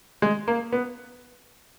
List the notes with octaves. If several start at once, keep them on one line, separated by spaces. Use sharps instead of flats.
G#3
A#3
B3